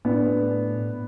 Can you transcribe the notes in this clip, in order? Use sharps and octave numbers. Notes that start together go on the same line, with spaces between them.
A2 B3 D4